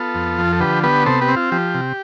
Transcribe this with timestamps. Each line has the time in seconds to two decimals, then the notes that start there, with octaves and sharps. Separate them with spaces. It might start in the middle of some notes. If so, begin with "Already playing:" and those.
Already playing: B3 F4 A4
0.15 F2
0.38 F3
0.53 A4
0.60 D3 G4 B4
0.83 B3 G4 B4
1.06 C3 A4 C5
1.21 G4 B4
1.29 C4
1.36 F4
1.52 F3 G4
1.74 C3